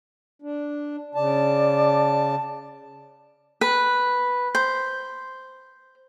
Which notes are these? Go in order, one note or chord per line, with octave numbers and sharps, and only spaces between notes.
D4
C#3 D5 A5
B4
C5